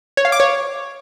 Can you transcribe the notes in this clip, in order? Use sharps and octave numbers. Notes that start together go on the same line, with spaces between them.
C#5
F5
D6
C#5